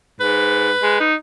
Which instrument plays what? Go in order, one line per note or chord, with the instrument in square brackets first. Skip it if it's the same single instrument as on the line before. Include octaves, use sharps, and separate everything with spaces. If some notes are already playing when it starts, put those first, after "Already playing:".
[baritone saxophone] G#2 [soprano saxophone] B4
[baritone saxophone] G#3
D#4